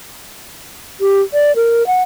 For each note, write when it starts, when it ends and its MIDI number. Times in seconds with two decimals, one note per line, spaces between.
1.01 1.21 67
1.33 1.54 74
1.56 1.86 70
1.87 2.02 78